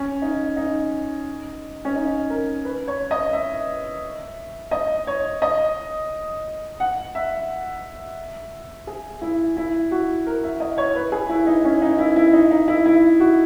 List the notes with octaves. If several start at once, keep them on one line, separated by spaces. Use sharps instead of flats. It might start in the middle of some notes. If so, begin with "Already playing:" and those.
Already playing: C#4
D#4
D#4
C#4
D#4
A#4
B4
C#5
D#5
E5
D#5
C#5
D#5
F#5
E5
G#4
E4
E4
F#4
A#4
E5
D#5
C#5
B4
G#4
E4
D#4
C#4
D#4
E4
E4
D#4
D#4
E4
E4
F#4